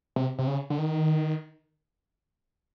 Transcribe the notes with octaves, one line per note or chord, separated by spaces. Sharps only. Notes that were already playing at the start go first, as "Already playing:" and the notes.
C3
C3
C#3
D3
D#3